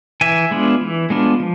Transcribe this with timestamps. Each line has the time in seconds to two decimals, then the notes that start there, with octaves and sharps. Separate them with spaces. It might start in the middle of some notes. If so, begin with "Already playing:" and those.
0.21 E3 E5 G#5
0.51 G#3 B3 D4 F4
0.81 E3
1.10 G#3 B3 D4 F4
1.40 F3